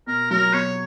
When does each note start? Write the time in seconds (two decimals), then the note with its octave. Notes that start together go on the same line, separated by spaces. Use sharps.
0.07 B2 A#4
0.31 F#3 A#4
0.53 B2 C#5